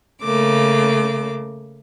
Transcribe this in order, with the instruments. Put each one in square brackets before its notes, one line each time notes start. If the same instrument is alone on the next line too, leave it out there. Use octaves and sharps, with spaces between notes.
[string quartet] C#3 A3 A#3 D6